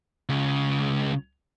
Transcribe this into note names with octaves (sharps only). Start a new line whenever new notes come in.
C#2 C#3